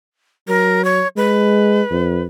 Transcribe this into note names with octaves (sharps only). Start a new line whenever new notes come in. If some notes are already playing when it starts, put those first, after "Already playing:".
F#3 A#4
C#5
G#3 B4
F2